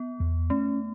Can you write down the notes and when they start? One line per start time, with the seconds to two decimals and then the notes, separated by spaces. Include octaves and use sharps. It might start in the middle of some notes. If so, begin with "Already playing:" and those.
Already playing: B3
0.20 E2
0.50 A3 C#4